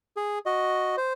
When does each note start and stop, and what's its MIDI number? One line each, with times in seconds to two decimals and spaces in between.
0.17 0.39 68
0.46 0.96 66
0.46 0.96 75
0.97 1.13 72